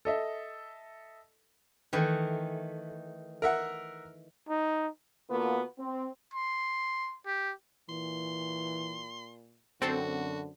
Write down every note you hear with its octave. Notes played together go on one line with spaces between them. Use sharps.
A4 D#5 E5
D#3 E3 A3 B4
A#4 E5 F#5
D#4
D3 A#3 B3 F4 F#4 B4
C4
C6
G4
A#2 E3 C6
F#2 D3 C4 F#4 A4